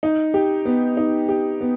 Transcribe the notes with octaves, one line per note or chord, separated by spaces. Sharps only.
D#4
G4
B3
D#4
G4
B3